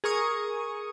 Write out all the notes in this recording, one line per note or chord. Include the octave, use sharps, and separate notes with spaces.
G#4 A#4 C#6 D#6